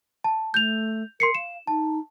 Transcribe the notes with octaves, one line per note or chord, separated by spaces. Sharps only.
A5
A3 G6 F7
A#4 C6 C7 C#7
F5 E7
D#4 A5